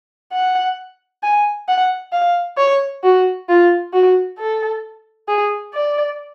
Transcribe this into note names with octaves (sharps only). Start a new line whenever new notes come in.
F#5
G#5
F#5
F5
C#5
F#4
F4
F#4
A4
G#4
D5